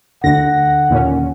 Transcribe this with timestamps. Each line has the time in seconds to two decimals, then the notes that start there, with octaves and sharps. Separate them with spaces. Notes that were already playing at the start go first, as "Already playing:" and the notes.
0.24 D2 D3 F#5 A#6
0.90 D#2 A#2 C#4